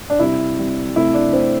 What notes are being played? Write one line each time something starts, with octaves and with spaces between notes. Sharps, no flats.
D4
C3 G3 E4
C3 G3
C3 A3 E4
D4
C3 A3 C4